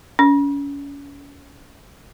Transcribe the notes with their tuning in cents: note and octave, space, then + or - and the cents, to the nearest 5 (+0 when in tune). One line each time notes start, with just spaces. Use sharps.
C#4 +35